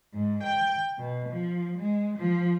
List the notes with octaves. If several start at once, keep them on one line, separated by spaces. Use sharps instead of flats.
G#2
G5
B2
F3
G#3
F3